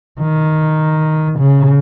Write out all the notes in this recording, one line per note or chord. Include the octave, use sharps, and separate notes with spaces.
D#3
C#3